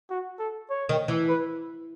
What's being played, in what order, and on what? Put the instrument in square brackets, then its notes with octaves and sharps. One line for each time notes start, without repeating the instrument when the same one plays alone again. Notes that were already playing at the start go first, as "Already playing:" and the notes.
[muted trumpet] F#4
A4
C#5
[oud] D#3
E3
[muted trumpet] B4